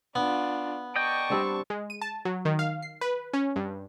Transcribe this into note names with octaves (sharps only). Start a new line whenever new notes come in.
B3 D4 F4
D5 D#5 G5 A5 C#6
G3 C4 D4
G#3
D#7
A5
F#3
D#3
F5
C7
B4
C#4
G2